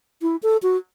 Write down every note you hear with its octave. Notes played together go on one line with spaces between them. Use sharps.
E4
A4
F#4